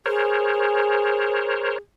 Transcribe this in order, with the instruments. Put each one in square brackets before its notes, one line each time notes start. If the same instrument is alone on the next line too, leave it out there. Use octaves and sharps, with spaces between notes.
[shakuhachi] G#4 [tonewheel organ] A#4 C5 C#5